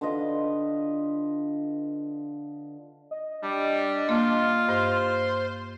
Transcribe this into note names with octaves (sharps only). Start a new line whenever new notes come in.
D3 F4 B4 D#5
D#5
G3 D4
A#3 F4
G2 C5